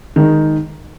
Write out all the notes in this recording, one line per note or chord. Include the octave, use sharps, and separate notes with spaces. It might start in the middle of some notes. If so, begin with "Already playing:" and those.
D#3 G#3 D#4